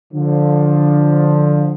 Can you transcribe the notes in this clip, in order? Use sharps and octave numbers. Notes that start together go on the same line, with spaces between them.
D3 F3